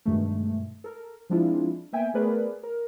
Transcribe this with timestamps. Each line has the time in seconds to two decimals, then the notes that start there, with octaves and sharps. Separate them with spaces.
0.06 G2 B2 D#3 G#3 A3
0.84 A4 A#4
1.30 F3 G#3 C4 D4 E4 F4
1.93 A#3 B3 E5 G5 G#5
2.14 A3 B3 G#4 A#4 B4 D5
2.63 A#4